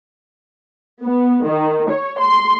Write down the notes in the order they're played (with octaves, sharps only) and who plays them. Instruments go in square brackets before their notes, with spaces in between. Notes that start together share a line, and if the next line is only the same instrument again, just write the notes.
[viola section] B3
D#3
C#5
C6